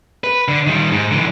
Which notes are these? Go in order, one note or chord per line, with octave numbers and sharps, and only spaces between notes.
B4
D3
D#3 G3
G#2
D3 E3